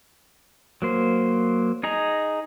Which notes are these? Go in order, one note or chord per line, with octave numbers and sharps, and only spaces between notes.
F#3 A#3 C5
D#4 G#4 D#5 A#5